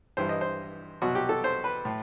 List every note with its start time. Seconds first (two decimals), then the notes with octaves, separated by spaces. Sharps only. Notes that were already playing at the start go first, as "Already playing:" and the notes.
0.17 G2 E3 G3 C5
0.29 D#5
0.41 C5
1.02 C2 B2 F#3 F#4
1.15 G4
1.29 A4
1.44 C5
1.64 B4
1.85 A2